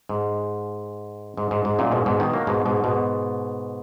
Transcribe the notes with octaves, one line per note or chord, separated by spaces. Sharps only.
G#2
G#2
G#2
G#2
F#2 A#2
G#2 B2
G#2 B2
B2 D#3
F#3 A#3
G#2 B2
G#2 B2
G#2 B2